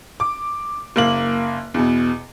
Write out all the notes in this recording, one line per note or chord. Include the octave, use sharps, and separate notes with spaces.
D6
F#1 A#3 F#7
E2 B2